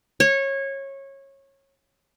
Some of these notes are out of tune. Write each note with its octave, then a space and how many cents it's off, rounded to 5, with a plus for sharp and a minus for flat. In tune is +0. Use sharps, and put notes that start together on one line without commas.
C#5 -20